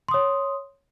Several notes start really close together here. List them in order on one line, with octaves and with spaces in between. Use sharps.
C6 D#6 C#5